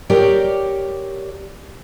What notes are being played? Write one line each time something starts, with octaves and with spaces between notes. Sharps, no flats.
G4 A#4 C#5 D5 G5